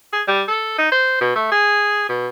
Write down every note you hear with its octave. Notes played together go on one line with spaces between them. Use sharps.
G#4
G3
A4
D#4
C5
B2
A3
G#4
B2